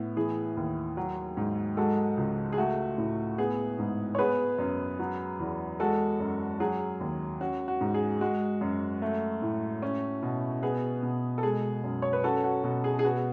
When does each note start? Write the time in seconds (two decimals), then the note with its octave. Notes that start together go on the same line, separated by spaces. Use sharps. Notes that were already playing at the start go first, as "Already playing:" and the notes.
Already playing: A2 B3
0.16 E3 G#4
0.57 D#2
0.97 F#3
1.37 G#2
1.77 G#3 F#4 A4
2.17 C#2
2.52 G#4
2.58 A3 F#4
2.98 A2
3.38 B3 G#4
3.79 G#2
4.15 C#5
4.19 B3 G#4 B4
4.58 F#2
4.99 F#3
5.40 E2
5.80 G#3 F#4 A4
6.20 F#2
6.60 F#3 G#4
7.00 D#2
7.41 C#4 F#4
7.68 F#4
7.81 G#2
7.94 G#4
8.21 G#3 F#4
8.61 F#2
9.02 A3
9.42 A2
9.83 C#4
10.22 B2
10.63 B3 G#4
11.03 B2
11.38 A4
11.43 G#3 G#4
11.84 F#2
12.02 C#5
12.13 B4
12.24 C#4 F#4 A4
12.44 F#4
12.64 B2 F#4
12.84 G#4
12.99 G#4
13.05 B3 F#4